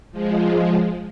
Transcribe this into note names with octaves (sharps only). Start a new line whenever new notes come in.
F3 G#3